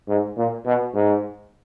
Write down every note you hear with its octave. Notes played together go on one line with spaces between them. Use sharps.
G#2
A#2
B2
G#2